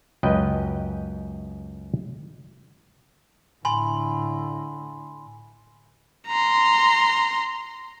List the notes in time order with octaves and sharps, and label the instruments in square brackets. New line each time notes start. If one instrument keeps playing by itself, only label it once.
[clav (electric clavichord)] C#2 F#2 B4 D#5 G5
[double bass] A2 D3 [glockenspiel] G#5 B5 C6
[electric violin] A#5 C6